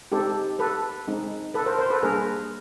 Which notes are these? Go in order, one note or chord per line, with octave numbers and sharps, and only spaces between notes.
G#3 C4 D#4 G4 A4
A4 B4
G#3 C4 D#4
A4 B4
A#4 C5
A#4 C5
A4 B4
G3 A#3 D4 G#4 A#4